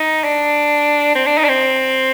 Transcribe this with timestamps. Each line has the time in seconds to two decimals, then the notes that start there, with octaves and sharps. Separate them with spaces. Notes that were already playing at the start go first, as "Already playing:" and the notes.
Already playing: D#4
0.24 D4
1.15 C4
1.26 D4
1.38 D#4
1.44 D4
1.49 C4